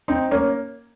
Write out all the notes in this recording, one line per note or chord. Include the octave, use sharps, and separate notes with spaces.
C4 D#4
A#3 C#4